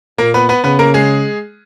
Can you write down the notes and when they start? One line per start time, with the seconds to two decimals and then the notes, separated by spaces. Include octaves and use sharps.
0.18 A#2 A#3 A#4
0.34 B3 B4
0.49 B3 B4
0.64 C#3 B3 B4
0.79 A#3 A#4
0.94 G#3 G#4